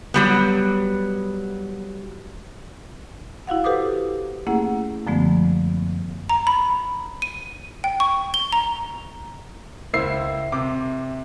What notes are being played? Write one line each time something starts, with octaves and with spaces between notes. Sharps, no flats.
F#3 G3 B3
E4 F#4 F5 F#5
G4 A4 B4 C5 D6 D#6
A3 A#3 C#4 E4 G#4 F#5
F#2 D3 F3 G#3 A3 B3
A#5
B5
D#7
G5
C#6
G7
A#5
C#2 A#3 E4 C5 E6 C7
C3 D6